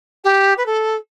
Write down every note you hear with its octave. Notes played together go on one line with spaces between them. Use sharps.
G4
B4
A4